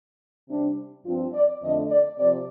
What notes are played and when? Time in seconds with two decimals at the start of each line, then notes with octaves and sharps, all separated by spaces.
0.48 C3 G3 C4 D4
1.05 G2 F3 C4 F4
1.33 D5
1.62 F2 D3 A3 D4 D#5
1.90 D5
2.19 C3 F3 D5